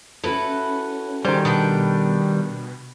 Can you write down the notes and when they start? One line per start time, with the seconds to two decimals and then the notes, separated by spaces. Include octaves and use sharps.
0.24 C#4 E4 F#4 A4 B4
1.25 D#3 G3 G4 G#4 C5
1.45 B2 B3 D4 G5